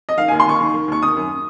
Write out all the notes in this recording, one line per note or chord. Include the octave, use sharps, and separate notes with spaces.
D#5
D#3 F5
D#2 G#5
C6
D#2 C#6
D#3
D#3
D#2 C#6
D#3 D#6
F#2